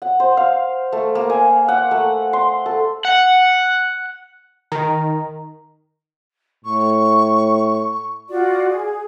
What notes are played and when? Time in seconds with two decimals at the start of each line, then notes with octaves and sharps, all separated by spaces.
0.02 F#5
0.20 C5
0.37 F5
0.92 A3
1.15 A#3
1.30 G#5
1.68 F#5
1.91 A3
2.33 C6
2.66 A4
3.05 F#5
4.72 D#3 A#5
6.65 A2 C#6
8.30 F4 F#4 D5
8.67 G#4